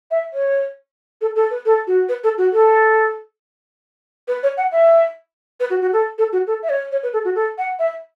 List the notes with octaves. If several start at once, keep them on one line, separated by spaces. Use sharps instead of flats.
E5
C#5
A4
A4
B4
A4
F#4
B4
A4
F#4
A4
B4
C#5
F#5
E5
B4
F#4
F#4
A4
A4
F#4
A4
E5
C#5
C#5
B4
A4
F#4
A4
F#5
E5